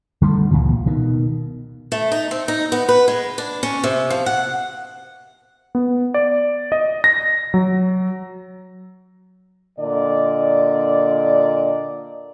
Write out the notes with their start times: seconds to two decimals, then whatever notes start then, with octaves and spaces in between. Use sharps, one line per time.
0.22 D3 G3 A3
0.51 C#2 A#2 E3 F#3
0.86 B2 D#3
1.92 A3
2.12 D#4
2.31 C4
2.48 D#4
2.72 B3
2.89 B4
3.08 G#3
3.38 D4
3.63 C#4
3.84 C3
4.10 F3
4.26 F#5
5.75 B3
6.14 D5
6.72 D#5
7.04 A#6
7.54 F#3
9.79 A#2 D3 D5 D#5